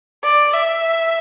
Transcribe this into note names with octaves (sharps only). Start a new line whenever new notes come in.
D5
E5